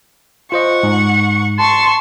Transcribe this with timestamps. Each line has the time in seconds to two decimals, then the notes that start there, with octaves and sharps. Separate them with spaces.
0.52 F4 C5 D#5 F#5 C#6
0.83 G#2
1.59 A5 C6 C#6